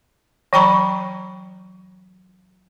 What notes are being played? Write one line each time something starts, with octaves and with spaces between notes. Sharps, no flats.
E3 F#3 G5 A#5 B5 C#6